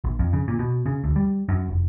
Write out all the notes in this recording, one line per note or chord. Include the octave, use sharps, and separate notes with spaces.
A#1
F2
C#3
A#2
B2
C#3
D2
G3
F#2
F1